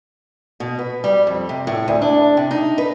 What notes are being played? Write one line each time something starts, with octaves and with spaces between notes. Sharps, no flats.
B2
B4
G3
F2
C3
A2
D2
D4
C3
D#4
B4